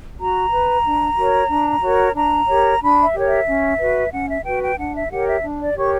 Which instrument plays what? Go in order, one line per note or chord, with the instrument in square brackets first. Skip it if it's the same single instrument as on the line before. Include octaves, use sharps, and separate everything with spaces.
[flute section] F#4 A#5
B4
D4
F#4 A#4 C#5
D4
F#4 A#4 C#5
D4 A#5
G4 A#4 C#5
D4 B5
E5
G4 A#4 C#5
E5
C#4
F#4 B4
C#4 F#5
E5
F#4 B4 G5
G5
D4 F#5
E5
G4 A#4 C#5 F#5
E5
D4
D5
G4 A#4 C#5 C#6